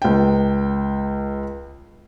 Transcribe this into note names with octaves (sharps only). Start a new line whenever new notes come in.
C#2 G5